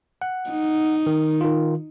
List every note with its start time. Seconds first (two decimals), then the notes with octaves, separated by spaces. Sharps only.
0.22 F#5
0.51 D#4
1.07 D#3
1.41 D#3 F4